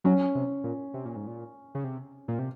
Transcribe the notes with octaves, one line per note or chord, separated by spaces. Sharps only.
F#3 C#4
C3
A#2
C3
A#2
G#2
A#2
C#3
C3
A#2
C3